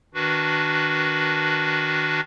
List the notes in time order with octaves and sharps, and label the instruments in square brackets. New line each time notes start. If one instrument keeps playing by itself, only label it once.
[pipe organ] D#3 D4 F#4 B4